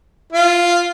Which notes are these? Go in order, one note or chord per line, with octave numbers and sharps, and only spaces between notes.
F4